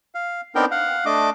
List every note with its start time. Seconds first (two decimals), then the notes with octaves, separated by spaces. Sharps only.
0.15 F5
0.55 B3 C4 D4 D#4 A#4 G5
0.71 F5 F#5
1.05 A3 D4 D#5 D6